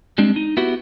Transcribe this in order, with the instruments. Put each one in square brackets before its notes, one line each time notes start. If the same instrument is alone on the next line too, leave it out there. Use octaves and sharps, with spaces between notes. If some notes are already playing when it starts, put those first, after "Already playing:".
[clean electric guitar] G3 G#3 C4 D4
D#4
B3 E4 F#4 G4